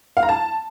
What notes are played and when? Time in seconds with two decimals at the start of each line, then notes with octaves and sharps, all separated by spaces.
0.17 F5
0.23 A#5
0.29 A5